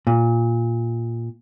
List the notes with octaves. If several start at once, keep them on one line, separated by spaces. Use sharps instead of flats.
A#2